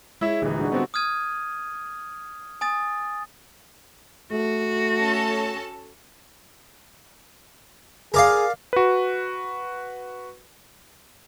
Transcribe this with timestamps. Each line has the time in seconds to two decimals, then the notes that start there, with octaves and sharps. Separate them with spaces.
0.21 G#3 E4 C#5 E5
0.42 D#1 D3 E3 D#4 G#4
0.58 D4 F#4
0.72 G3 B3 C4 F#4
0.94 D#6 F6 G#6 D#7
2.61 G#5 D#6 A6
4.32 A3 F#4
4.99 C#4 A4 A5
8.14 G#4 A#4 D5 F5
8.73 F#4 B4